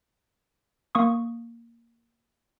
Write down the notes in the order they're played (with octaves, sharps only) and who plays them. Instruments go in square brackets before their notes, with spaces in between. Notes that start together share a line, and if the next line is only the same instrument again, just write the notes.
[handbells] A#3 C#6 D#6